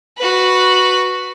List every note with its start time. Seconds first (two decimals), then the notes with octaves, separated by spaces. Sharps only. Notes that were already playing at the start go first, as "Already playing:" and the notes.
0.18 F#4 B4